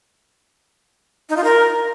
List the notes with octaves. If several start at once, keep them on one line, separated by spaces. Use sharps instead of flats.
D#4
F4
A#4